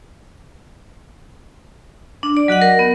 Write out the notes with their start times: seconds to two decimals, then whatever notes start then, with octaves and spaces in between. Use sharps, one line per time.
2.23 D4
2.37 D5
2.48 F#3 F#4 D#5 F#5
2.62 A#4
2.79 B3